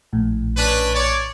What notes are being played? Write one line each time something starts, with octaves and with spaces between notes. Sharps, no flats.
A#1 A2
C#4 D4 B4
C#5 D5